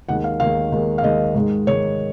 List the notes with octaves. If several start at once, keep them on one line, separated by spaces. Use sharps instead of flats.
D#2 D#3 G#3 F#5
F5
D#2 D#3 G#3 F5
D#2 D#3 G#3
F5
D#2 D#3 G#3 D#5
G#2 D#3 G#3
G#2 D#3 G#3 C#5